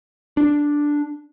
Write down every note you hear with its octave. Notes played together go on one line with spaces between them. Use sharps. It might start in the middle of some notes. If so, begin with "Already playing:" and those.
D4